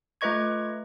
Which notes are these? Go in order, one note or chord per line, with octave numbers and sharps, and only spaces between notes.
A3 F4 B4 D#5 C#6 G#6